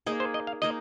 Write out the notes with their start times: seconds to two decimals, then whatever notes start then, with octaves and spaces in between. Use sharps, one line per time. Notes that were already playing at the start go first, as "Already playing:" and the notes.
0.06 A#3 D#4 G#4 D#5
0.20 C5
0.34 D#5
0.47 F5
0.62 A#3 D#4 G#4 D#5